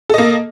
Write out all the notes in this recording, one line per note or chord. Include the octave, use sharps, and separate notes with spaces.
A#3 A4 D#5